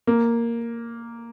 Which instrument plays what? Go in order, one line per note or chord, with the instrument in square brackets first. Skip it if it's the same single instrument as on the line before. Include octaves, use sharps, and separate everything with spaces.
[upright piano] A#3